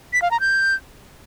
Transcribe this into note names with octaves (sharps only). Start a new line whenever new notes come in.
B6
F5
A#5
G6